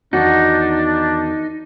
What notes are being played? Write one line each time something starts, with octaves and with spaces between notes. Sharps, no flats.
E2 D#3 D4 D#4 F#4